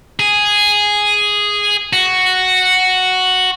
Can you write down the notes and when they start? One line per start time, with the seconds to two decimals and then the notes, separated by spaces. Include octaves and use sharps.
0.20 G#4
1.93 F#4